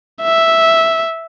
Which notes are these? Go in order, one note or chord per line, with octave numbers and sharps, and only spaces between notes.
E5